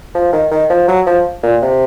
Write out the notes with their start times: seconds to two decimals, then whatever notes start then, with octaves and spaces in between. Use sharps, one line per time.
0.15 F3
0.33 D#3
0.52 D#3
0.70 F3
0.88 F#3
1.07 F3
1.43 A#2
1.63 C3